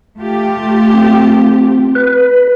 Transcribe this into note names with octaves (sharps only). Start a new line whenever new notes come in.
A3 F4 G4
C4
B4